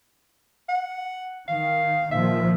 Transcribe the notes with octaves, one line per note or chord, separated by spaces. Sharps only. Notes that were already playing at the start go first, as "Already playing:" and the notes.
F#5
D#3 F5
A#2 D#3 F3 E5